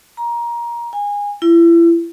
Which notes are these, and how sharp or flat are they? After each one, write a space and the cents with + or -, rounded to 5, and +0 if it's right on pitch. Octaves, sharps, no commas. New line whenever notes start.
A#5 +20
G#5 -25
E4 +35